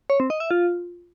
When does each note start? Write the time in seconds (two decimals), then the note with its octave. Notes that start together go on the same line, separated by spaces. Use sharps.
0.10 C#5
0.20 C4
0.30 D#5
0.40 E5
0.51 F4